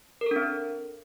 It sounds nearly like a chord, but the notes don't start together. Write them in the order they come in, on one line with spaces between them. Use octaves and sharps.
A#4 A4 D4 C4